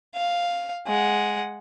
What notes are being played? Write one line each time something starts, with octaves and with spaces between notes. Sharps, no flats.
F5
G#3 F#5